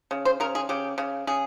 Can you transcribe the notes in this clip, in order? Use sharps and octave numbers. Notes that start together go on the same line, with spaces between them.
C#3
C5
C#3 A#4
G#4
C#3 G4
C#3
C#3 G#4